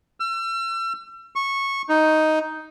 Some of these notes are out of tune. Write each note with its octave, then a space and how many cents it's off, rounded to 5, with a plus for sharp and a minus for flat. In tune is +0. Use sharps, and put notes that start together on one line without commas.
E6 +40
C#6 -15
D#4 +5